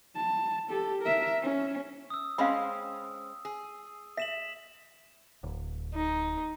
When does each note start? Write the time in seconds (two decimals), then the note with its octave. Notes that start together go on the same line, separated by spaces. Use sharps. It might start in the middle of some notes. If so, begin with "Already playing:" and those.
0.16 A5
0.69 G4 A4
1.02 A#4 E5
1.42 C#4
2.10 D#6 E6
2.38 G#3 C4 C#4 F5 B5
3.45 G#4
4.17 E5 B6 E7 F#7
5.43 D1
5.94 D#4